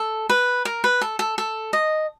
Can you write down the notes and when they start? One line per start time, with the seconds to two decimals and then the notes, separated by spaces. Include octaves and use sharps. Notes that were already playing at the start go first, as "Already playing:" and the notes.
Already playing: A4
0.29 B4
0.65 A#4
0.84 B4
1.01 A4
1.19 A4
1.38 A4
1.73 D#5